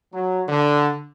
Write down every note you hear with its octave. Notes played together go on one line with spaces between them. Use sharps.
F#3
D3